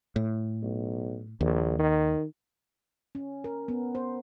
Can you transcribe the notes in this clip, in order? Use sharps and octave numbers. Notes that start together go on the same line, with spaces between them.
A2
B1
A#1 D#2
D#3
C#4
A#4
B3
C5